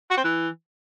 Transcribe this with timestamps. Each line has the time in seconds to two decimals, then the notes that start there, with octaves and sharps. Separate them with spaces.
0.11 F#4
0.17 C4
0.24 E3